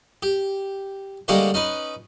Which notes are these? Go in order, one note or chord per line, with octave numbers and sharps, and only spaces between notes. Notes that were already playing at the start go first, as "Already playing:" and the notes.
G4
D3 G3 G#3 A#3 G4 C#5
C#4 D#4 B4